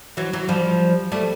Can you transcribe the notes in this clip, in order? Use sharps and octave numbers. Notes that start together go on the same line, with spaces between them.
E3 F#3
E3 F#3
F3 G3
G3 A3